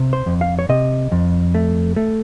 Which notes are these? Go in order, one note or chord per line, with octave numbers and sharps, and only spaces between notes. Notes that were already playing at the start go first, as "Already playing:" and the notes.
Already playing: C3
C5
F2
F5
C#5
C3 D#5
F2
A3
A3